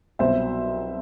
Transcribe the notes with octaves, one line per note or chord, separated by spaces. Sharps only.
C2 B2 F#3 C5 E5